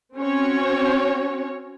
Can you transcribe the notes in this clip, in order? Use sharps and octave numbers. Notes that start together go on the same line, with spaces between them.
C4 C#4 F#4 C#5